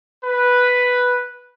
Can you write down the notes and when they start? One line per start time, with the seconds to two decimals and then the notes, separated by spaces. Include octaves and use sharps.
0.24 B4